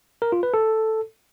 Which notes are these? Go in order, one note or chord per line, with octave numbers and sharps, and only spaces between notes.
A#4
F4
B4
A4